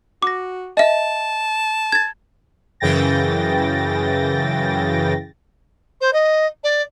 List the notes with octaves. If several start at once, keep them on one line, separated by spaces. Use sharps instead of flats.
F#4 D6 A#6
D#5 E5 A5
G#6 A6
F#2 C#3 E3 G5 A6 A#6
C5
D#5
D5